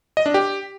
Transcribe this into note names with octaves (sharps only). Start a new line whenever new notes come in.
D#5
D4
G4